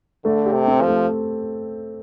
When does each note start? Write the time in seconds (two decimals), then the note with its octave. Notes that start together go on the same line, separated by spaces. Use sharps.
0.24 D3 A3
0.46 G4
0.53 C3
0.67 C4
0.82 F3
0.88 A3